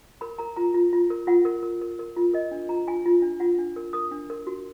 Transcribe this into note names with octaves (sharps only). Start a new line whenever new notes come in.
A#4 B5
A#4 A#5
F4 A#5
F4
F4
A#4
F4 F#5
A#4
A#4
A#4
A#4
F4
A#4 D#5
D4
F4 A#5
F4 G#5
F4
D4
F4 F#5
D4
A#4
A#4 D#6
D4
A#4
F#4